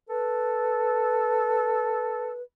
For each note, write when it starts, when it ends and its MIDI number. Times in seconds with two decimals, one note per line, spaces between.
0.09 2.36 69
0.09 2.42 71